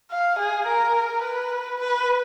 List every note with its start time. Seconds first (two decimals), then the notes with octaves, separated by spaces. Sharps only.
0.11 F5
0.39 G#4
0.67 A#4
1.23 B4
1.79 B4